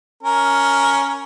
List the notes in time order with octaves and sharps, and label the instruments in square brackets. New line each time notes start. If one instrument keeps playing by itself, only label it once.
[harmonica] C#4 A#4